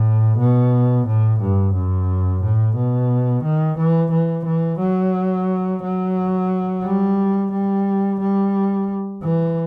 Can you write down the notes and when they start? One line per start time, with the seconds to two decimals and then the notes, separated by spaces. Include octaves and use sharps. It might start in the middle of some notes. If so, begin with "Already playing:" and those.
Already playing: A2
0.38 B2
1.07 A2
1.40 G2
1.74 F#2
2.43 A2
2.76 B2
3.44 D#3
3.78 E3
4.12 E3
4.46 E3
4.80 F#3
5.83 F#3
6.84 G3
7.52 G3
8.20 G3
9.22 E3